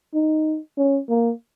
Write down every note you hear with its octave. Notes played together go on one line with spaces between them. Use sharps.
D#4
C#4
A#3